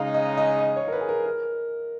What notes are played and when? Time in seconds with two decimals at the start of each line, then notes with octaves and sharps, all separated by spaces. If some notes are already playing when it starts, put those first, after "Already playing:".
Already playing: C#3 G#3 D#4 F5
0.14 D#5
0.38 D#5
0.59 D#5
0.76 C#5
0.88 A#4
0.92 B4
1.01 G#4
1.09 A#4
1.26 A#4